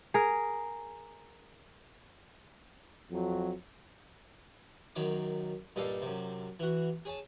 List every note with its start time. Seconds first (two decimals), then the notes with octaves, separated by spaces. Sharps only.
0.14 G#4 A#4
3.11 F2 F#3
4.96 F#2 D#3 C#5 D6
5.76 G2 A#2 D#4 A4 F5
6.02 F#2 C3
6.60 E3 F#4
7.05 G#4 C#5 G#5 A5